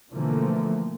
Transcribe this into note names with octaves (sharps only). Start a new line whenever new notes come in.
B2 D3 E3 F3 A3 A#3